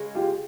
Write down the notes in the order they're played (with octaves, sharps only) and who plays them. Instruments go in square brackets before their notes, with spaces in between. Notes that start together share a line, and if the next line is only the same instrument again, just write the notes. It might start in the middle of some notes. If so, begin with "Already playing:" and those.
Already playing: [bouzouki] C#3 G#3
[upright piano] F4 G4